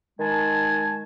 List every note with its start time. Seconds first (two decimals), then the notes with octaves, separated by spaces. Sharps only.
0.20 D#3 G#3 G#5 A5